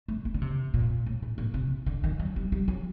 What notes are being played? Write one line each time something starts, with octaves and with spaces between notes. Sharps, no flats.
A3
A#3
D3
C3
A#2
A2
A2
A#2
C3
D3
D#3
F#3
G3
G3
F#3